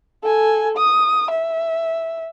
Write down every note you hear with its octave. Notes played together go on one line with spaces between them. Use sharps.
A4 G#5
D#6
E5